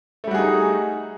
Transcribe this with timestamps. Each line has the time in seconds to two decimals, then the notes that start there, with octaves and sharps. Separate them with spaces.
0.24 A3
0.27 G3
0.31 F#4
0.34 G#4
0.38 D#4